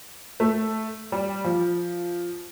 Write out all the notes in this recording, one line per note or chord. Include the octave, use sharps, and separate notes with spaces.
A3
G3
F3